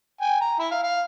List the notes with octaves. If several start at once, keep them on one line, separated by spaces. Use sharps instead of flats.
G5 G#5
A#5
E4 B5
F5
F5